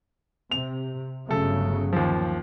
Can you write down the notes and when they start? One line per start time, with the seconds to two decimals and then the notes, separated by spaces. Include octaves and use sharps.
0.51 C3 F7
1.29 G1 C#3 F#3 A3 A4
1.93 D#2 F3